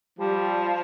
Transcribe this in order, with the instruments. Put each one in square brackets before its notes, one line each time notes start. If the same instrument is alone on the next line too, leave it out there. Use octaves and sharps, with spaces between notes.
[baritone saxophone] F3 [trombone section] G3